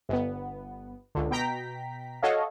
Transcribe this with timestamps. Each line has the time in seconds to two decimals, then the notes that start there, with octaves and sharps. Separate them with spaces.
0.09 G1 B3
1.15 C#2 D3
1.31 B2 G5 A#5 B6
2.22 F#4 A4 C#5 D#5 F5